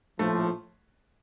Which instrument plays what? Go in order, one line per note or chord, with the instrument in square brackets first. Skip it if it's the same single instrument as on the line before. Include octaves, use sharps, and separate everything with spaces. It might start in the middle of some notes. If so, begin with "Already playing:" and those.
[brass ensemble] A#1 A2 F3 [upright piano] A3